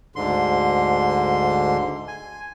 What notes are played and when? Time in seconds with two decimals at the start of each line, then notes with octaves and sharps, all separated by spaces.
0.16 D2 G#2 D3 C6
2.08 G#5